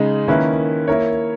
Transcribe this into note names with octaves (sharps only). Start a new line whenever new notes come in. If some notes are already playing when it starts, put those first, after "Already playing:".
Already playing: C#3 G#3 D#4
D#3 A#3 C#4 E4 B4
A#3 E4 A#4 C#5